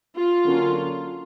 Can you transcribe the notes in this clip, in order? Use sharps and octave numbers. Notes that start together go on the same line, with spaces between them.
F4
D3 F#3 A#3 C#4